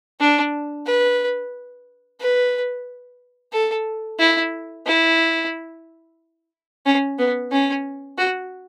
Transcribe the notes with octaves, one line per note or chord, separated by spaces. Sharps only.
D4
B4
B4
A4
E4
E4
C#4
B3
C#4
F#4